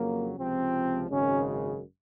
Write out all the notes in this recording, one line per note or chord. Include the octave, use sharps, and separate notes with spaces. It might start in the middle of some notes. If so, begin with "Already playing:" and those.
Already playing: F2 C#3 F#3 A#3
C#2 C3 F3 C4
G#1 F#2 C#3 G#3 C#4